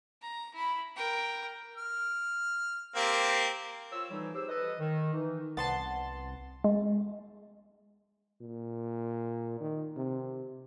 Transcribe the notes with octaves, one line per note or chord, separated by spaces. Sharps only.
A#5
E4 B5
A#4 G5
F6
A#3 C4 G4
F3 F4 C#5 E6
A2 E3 F3 G3 D#4 C#5
C4 G4 G#4 C5 E6
A4 B4 D#5
D#3
E3 D#4
C2 B3 F#5 A5 C6 A6
G#3
A#2
D#3
C3